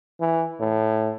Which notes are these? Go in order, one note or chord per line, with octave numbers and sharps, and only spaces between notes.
E3
A2